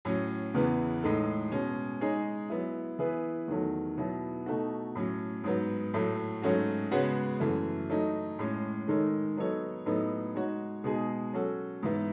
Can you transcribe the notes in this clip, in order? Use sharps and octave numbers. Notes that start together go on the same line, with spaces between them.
A2 F#3 C#4
E2 C#3 E3 B3
A2 G#3 D#4 A4
B2 G#3 C#4
G#3 D#4 G#4 C#5
F#3 B3 E4
E3 B3 E4 G#4 B4
E2 D#3 F#3 A3
B2 F#3 B3 E4
B2 A3 D#4 F#4
A2 F#3 C#4
G#2 F#3 B3
A2 F#3 A3
G#2 F#3 A3 C#4 F#4
C#3 G#3 B3 F#4 C#5
F#2 E3 A3
F#3 A3 D#4
A2 G#3 C#4
D#3 G#3 D#4 A4 C#5
F#3 B3 D#4 A4 C#5
A2 F#3 B3 D#4 A4
G#3 D#4 F#4 C#5
B2 G#3 D#4 G#4
F#3 C#4 F#4 A4
G#2 E3 B3 E4